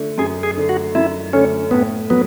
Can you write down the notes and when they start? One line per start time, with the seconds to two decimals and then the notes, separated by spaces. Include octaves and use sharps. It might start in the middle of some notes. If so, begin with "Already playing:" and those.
Already playing: D3 A3
0.18 F#2 G#4
0.43 G#4
0.57 D3 A3
0.69 F#4
0.95 F#2 E4
1.33 D3 A3 C#4
1.71 A2 B3
2.10 F#3 B3